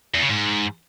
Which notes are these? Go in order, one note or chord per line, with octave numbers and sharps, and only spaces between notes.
E2
C#3
G#2